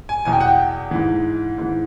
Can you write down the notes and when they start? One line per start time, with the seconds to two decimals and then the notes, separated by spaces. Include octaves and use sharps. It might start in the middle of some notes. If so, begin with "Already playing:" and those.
0.09 G#5
0.25 E2 B2 G#5
0.33 G5
0.40 F#5
0.48 G5
0.91 G#2 E3
1.58 G#2 E3